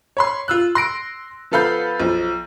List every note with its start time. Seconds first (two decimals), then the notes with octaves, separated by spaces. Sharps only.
0.17 C#5 B5 C6
0.48 F4 E6 F#6
0.75 C6 A#6 D7
1.51 F3 B3 A4 F5 B5 G6
2.00 B1 F3